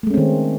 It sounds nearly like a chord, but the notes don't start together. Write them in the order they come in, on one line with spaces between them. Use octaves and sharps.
A3 G#3 C#4 C4 D#3